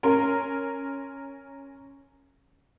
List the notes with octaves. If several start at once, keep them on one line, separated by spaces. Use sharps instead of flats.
C#4 A#4 C6